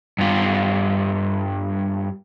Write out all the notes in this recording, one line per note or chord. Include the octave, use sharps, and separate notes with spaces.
G2 F4